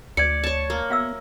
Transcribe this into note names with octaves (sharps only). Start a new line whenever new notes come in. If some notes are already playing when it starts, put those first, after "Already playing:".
D2 D5 G#6 C#7
C#5 A5
A#3
B3 F#4 E5 E6